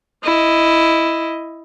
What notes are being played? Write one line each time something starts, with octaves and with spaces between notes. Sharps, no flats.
E4 D#5